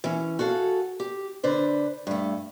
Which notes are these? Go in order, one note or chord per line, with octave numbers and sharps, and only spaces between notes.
E3 C#4
F#4 G#4 A4 F5
G4
D3 D4 B4 C5
G2 A3